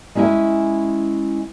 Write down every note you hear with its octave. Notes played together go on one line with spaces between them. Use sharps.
G#3 C#4 E4 E5 G#5